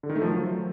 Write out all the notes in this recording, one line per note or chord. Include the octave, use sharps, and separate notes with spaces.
D3
D#3
A3
F3
F#3